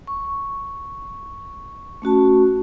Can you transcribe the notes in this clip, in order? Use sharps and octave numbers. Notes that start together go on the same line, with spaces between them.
C#6
A3 C#4 F#4 A5